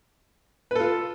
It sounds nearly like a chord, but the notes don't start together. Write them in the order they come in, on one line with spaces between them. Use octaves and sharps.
B4 A4 F4